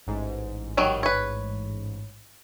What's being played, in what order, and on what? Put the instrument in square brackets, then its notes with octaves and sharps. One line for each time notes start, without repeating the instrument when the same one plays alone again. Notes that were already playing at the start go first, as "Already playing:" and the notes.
[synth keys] A1 G#2
[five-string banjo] D#3 F#3 G3
B4 C#5